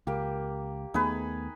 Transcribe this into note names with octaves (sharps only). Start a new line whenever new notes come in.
C#2 A#3 G4
D#2 A3 B3 D#4 G#4 B4